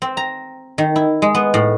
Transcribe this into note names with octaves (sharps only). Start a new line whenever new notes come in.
C4
A#5
D#3
E4
G#3
B3
A2